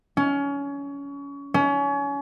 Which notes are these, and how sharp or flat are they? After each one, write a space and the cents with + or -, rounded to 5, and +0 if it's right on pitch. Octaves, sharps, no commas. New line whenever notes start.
C#4 +25
C#4 +30